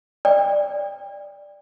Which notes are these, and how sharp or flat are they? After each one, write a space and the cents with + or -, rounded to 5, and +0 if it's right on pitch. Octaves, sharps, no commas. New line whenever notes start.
D5 +0 G5 +30